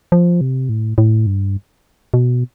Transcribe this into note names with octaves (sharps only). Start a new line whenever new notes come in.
F3
C3
A2
A2
G2
B2